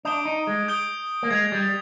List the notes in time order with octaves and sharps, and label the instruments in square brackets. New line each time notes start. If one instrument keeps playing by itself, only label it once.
[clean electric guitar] D4 [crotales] D#6 G6 D7 G7
[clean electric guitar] D#4
G#3
[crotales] D#6 G6 D7 G7
[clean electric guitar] A#3
[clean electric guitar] G#3 [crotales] G#6 C7 F7
[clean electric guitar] G3